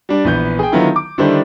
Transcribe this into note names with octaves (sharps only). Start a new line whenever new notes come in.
G3 D4
A#1 E3 B3 G6
G#4 G5
D3 D#3 F#3 B3 E4 F4
D6
D3 D#3 G3 D4 E4 C5